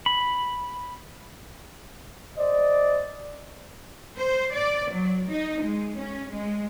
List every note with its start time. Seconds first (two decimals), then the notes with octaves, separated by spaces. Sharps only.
0.06 B5
2.37 C5 D5 D#5
4.18 C5
4.54 D5
4.94 F#3
5.29 D#4
5.64 G#3
5.97 C#4
6.32 G#3